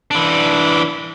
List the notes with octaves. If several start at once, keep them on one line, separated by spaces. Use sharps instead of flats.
E3 D4